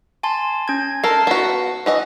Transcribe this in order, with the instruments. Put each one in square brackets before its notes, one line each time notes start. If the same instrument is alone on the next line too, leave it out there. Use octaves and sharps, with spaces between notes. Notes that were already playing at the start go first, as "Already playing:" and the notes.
[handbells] G#5 A5 C6
C#4 G#6
[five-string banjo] A4 A#4 [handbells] A5 C7
[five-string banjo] B3 F#4
E3 F#4 D#5